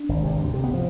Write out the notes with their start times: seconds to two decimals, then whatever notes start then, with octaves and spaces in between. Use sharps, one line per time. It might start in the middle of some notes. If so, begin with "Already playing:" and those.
Already playing: D4
0.09 G#1
0.23 C3
0.39 D2
0.54 C3
0.64 B3
0.74 F3